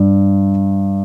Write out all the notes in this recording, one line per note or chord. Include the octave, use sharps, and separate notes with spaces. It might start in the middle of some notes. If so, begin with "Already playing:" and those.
Already playing: G2 G3